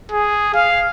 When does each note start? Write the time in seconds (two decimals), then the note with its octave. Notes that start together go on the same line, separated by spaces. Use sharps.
0.12 G#4
0.54 F5